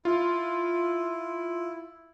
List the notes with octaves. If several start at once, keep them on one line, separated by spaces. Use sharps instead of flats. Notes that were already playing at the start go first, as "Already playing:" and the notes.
E4 F4